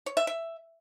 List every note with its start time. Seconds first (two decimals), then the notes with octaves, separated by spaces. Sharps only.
0.06 C#5
0.17 E5
0.27 E5